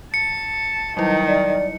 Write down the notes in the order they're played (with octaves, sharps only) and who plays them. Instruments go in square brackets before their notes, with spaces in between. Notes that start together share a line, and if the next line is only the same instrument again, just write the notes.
[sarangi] A5 [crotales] C#7
[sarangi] D#3 [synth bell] F#3 G3 E4
[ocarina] D5